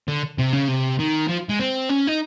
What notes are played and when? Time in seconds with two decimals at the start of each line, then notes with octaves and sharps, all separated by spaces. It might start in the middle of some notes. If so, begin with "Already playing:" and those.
0.08 D3
0.38 C3
0.53 C#3
0.68 C3
0.99 D#3
1.28 F3
1.49 G#3
1.60 C4
1.89 C#4
2.07 D#4